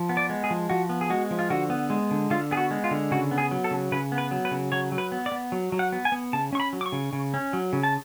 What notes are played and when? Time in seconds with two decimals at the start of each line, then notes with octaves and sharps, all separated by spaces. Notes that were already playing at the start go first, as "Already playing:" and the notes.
Already playing: F3
0.09 B3
0.17 D5
0.29 G#3
0.44 G#4
0.50 F3
0.70 F3 F#4
0.89 B3
1.01 G#4
1.10 G#3 F#4
1.31 F3
1.39 F4
1.50 D3 F#4
1.70 B3
1.90 G#3
2.11 D3
2.30 D3 F4
2.51 B3 G#4
2.57 F#4
2.71 G#3
2.84 F4
2.91 D3
3.11 C#3 F#4
3.31 B3
3.38 G#4
3.51 F#3
3.64 A4
3.71 C#3
3.92 C#3 B4
4.12 B3
4.18 B4
4.31 F#3
4.45 B4
4.51 C#3
4.72 F#3 C#5
4.92 F#3
4.98 B4
5.12 B3
5.26 D5
5.32 B3
5.52 F#3
5.72 F#3
5.79 F#5
5.92 B3
6.05 G#5
6.12 B3
6.33 C#3 A5
6.53 C#4 C#6
6.60 B5
6.73 F#3
6.81 D6
6.86 C#6
6.92 C#3
7.13 C#3
7.34 C#4
7.53 F#3
7.73 C#3
7.83 A5